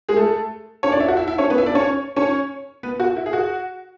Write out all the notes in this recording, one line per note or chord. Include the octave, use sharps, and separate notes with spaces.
G#3 G#4
A3 A4
C#4 C#5
D4 D5
E4 E5
F#4 F#5
E4 E5
E4 E5
C#4 C#5
B3 B4
E4 E5
D4 D5
C#4 C#5
C#4 C#5
B3 B4
F#4
E4
G#4
F#4